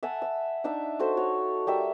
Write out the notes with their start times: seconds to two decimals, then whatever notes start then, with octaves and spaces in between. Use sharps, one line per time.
0.03 E5 F#5 G#5 A5
0.22 E6
0.64 D4 D#4 E5
0.99 F#4 A4 C5
1.17 F#4 C#5
1.67 G3 A#4 E5